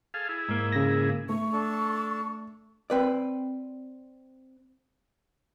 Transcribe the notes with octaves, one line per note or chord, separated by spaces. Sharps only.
G#4 A4 F5
E4 G#4
G#2 A#3
C#3 A#6
A3 C#6
D4 A4
C4 B4 D5